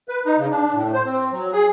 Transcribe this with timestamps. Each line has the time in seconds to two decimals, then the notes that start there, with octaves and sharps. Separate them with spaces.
0.09 B4
0.25 D#4
0.38 C#3
0.51 D4
0.73 A2
0.93 C5
1.05 C4
1.32 F#3
1.53 G#4